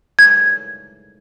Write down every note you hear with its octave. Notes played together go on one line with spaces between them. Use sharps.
G#6